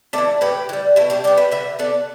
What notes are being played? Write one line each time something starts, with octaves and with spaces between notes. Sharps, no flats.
A3 A4 D5
E3
A2 G4 B4
E3
G3
B2 E4 A4
D4 G4
G3 B3 D5 G5
B4 E5
D3 B4 E5
B3 A4 D5